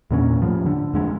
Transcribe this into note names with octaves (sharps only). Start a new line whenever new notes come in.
E2 A#2 D3 C#4
A2 F3
D3
F2 D3 G#3